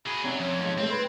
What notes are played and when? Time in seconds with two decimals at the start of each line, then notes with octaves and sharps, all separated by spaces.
0.06 F#3 G#4 B5
0.24 C3 F#3 C#4 D5
0.40 F2 C#5
0.58 B1 G#2
0.78 C2 G#2 A3 C4
0.90 B4 B5 C6 G#6